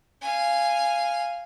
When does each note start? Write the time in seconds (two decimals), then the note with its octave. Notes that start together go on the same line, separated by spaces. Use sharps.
0.21 F5 G#5